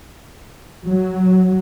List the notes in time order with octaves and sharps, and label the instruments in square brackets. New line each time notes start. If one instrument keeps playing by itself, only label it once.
[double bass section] F#3